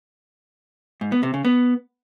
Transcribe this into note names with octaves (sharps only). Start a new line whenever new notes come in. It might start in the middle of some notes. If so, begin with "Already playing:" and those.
G#2
B3
C3
C#3
B3